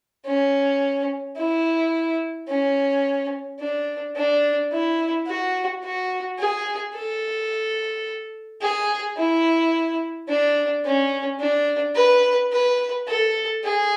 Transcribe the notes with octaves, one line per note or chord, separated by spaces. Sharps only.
C#4
E4
C#4
D4
D4
E4
F#4
F#4
G#4
A4
G#4
E4
D4
C#4
D4
B4
B4
A4
G#4